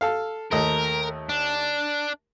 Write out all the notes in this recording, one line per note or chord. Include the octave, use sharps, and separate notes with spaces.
A4 F5
D#2 A3 A#4 D#5
D4